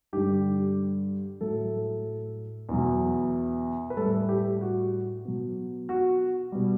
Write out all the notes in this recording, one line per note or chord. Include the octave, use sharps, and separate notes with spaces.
G2 D3 G3 G4
A2 F#3 A4
E2 B2 F#3
B4
A2 G3 A4
G4
F#4
B2 F#3
F#4
B2 G3